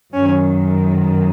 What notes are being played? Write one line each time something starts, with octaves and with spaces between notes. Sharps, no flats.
F#2 D#3 C#4